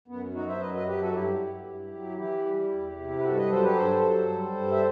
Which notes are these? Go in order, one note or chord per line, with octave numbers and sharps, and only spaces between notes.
F#2 B3
F#3 D#4 F#4
C5 E5
F#2 B4 D#5
B4 D#5
F#3 G4 B4
F#4 A4
G2 E4 G4
F#3
G2
F#3
E3 E4 G4
G3
E2
C3
B4
G2 F#4 A4
B4 D#5
F#3 A4 C5
G4 B4
G2 A4 C5
F#3
G3
G2
E5